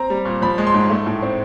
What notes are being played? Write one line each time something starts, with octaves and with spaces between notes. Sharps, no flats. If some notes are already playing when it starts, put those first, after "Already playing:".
Already playing: C4 A#5
G3
A#2
F3 B5
G#3
C6
G#2
A3
A2
C4